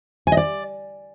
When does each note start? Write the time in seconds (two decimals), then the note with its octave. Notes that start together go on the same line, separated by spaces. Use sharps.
0.27 G#5
0.32 D#5
0.37 D5